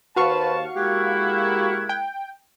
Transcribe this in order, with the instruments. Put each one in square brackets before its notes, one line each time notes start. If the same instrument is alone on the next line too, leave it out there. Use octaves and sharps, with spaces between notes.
[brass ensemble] D#2 C5 A5 [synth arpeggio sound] F#4 F5 C#6 [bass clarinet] B4
[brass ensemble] G#3 A#3 E4 [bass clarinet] G4 [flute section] F#6 G#6
[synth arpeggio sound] G5